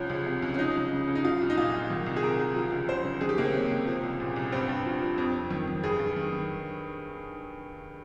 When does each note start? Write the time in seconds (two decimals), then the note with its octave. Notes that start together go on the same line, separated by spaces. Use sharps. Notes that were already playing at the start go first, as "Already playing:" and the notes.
Already playing: C2 F3 C#4
0.09 C#2
0.26 C3
0.42 C#2
0.54 C#4
0.59 F3 D#4
0.76 C#2
0.92 C#3
1.08 C#2
1.15 D#4
1.24 F3 F4
1.42 C2
1.50 D#4
1.57 A#2 F4
1.73 C2
1.90 D#3
2.06 C2
2.16 G#4
2.23 C3 A#4
2.40 C2
2.56 F3
2.72 C#2
2.88 C#3 C5
3.04 C#2
3.21 D#3 G#4
3.29 G4
3.38 C#2 A#3
3.46 C4
3.54 C3 C#4
3.71 C#2
3.87 F3 C4
4.03 C2
4.20 A#2
4.36 C2
4.52 G2 C4
4.69 G2
4.86 F3
5.02 F3
5.18 F2
5.34 F2
5.51 D#3
5.67 D#3
5.84 G2 G#4
5.99 G2
6.16 D#3
6.33 D#3